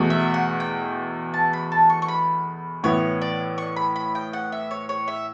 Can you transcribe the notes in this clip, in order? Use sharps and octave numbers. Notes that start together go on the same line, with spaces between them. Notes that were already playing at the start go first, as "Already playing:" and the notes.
Already playing: E2 B2 A3
E5
F#5
G5
A5
B5
A5
C#6
C#6
B5
A2 E3 B3 E4 C#5
D5
C#6
B5
B5
G5
F#5
E5
C#5
C#5
E5